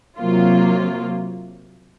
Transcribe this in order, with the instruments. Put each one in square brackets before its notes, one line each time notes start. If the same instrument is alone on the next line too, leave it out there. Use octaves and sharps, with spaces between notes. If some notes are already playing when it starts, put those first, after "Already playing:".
[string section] C3 F#3 A#3 F4